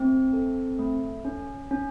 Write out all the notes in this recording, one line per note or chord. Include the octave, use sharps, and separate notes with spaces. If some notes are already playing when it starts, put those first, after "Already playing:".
Already playing: A3 C4
A4
A3
C#4
C#4